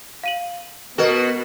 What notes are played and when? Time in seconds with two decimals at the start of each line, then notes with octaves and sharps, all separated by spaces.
0.24 F5 D#7 F#7
0.98 B2 B3 F#4 A#4 B4 D#5